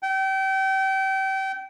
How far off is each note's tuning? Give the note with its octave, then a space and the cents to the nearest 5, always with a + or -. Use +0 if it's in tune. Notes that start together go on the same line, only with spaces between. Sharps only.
G5 -30